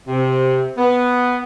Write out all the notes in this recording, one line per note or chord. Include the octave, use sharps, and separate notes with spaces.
C3
B3